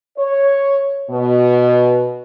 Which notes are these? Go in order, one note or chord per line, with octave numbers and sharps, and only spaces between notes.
C#5
B2